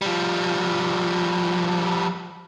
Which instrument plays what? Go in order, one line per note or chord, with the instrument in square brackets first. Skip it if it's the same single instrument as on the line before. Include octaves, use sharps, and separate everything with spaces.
[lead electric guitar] F3 G3